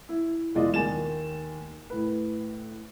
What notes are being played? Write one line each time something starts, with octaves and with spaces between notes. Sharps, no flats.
E4
E1 E3 G#3 F4 D5 D#5
D#2 D#3 G#5 A6 E7
A2 B4